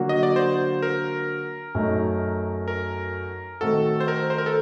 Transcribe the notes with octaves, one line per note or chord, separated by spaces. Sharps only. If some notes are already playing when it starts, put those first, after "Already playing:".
Already playing: D3 F#3 A#3 F#4
D#5
D5
C5
A#4
F#2 F#3 A3 D#4
A#4
D#3 A3 C4 F#4 A4
C5
A#4
C5
A#4
A4